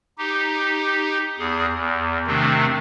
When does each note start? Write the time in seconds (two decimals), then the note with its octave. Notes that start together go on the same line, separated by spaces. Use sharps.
0.18 D#4 G4
1.39 E2 G#4
1.76 E2
2.27 C3 D#3 A3 C4 D4